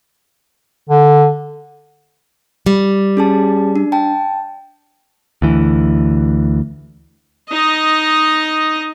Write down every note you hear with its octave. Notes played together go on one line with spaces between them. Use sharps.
D3
G3
C#4 G#4 A5
D4
G5 A5
D2 E3
D#4 D#5